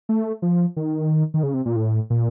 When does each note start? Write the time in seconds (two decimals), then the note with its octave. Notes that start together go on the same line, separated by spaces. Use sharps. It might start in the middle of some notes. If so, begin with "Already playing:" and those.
0.09 A3
0.42 F3
0.76 D#3
1.34 D#3
1.43 C#3
1.54 C3
1.66 A#2
1.76 A2
2.10 A#2